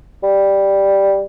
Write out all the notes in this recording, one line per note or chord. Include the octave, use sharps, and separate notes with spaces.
G3